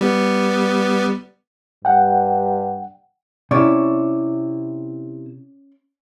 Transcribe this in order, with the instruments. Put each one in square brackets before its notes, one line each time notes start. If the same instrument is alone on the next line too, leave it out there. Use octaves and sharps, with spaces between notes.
[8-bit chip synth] G3 B3
[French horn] G2 [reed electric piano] F#5 G5
[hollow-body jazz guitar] C3 E4 [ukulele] C#4 C#5 D5